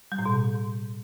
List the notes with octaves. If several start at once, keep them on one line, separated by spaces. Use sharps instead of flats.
G3
A2
B2